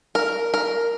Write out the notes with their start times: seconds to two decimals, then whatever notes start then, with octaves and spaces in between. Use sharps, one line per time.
0.15 A#4
0.54 A#4